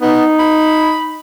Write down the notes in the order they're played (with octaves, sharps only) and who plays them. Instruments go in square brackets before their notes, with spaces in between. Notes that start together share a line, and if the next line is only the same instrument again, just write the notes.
[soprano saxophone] B3 [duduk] D#4
[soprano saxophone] B5